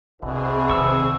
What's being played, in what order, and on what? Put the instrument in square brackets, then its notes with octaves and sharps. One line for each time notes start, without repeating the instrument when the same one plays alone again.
[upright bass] C2 [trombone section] B2 D3 E3 [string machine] C4 G#4
[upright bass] C3 D#3 [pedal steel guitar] C#6 E6